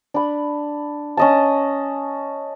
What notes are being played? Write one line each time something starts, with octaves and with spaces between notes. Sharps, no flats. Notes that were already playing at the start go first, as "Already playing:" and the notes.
D4 B5
C#4 D#5 A5